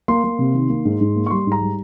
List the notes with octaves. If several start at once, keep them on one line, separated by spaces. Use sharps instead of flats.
A#3 C6
A#3
C3
D#3
A#3
G#2
G#2
A#3
C#6
G3 C6
G#2 A#5
G3